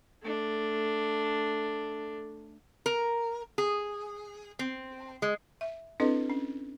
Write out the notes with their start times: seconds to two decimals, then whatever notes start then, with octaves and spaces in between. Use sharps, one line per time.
0.23 A3 D4
2.86 A#4
3.58 G#4
4.59 C4
5.22 G#3
5.61 E5
6.00 C4 D4 E4 A4 B4 D#5
6.30 C#4